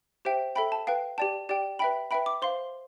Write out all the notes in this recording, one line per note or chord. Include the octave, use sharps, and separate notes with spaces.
G4 C5 E5 G5
A4 E5 G5 B5
A5
B4 F5 G5
G4 D5 G5 A5
G4 D5 G5
B4 E5 G5 B5
B4 E5 G5 B5
D6
C5 F5 C6